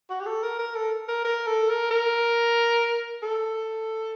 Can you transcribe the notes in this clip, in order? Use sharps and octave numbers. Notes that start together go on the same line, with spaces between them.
F#4
G4
A4
A#4
A#4
A4
A#4
A#4
A4
A#4
A#4
A4